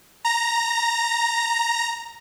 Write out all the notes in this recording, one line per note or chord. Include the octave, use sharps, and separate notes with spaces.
A#5 A#6